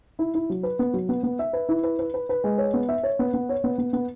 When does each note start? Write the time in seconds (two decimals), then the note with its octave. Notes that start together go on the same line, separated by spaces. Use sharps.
0.19 E4
0.34 E4
0.50 F#3
0.63 B4
0.79 B3
0.94 F#3
1.09 B3
1.23 B3
1.39 E5
1.53 B4
1.69 E4
1.83 B4
1.99 B4
2.14 B4
2.29 B4
2.44 G#3
2.58 C#5
2.74 B3
2.89 E5
3.03 C#5
3.19 B3
3.34 B3
3.49 C#5
3.64 B3
3.78 B3
3.93 B3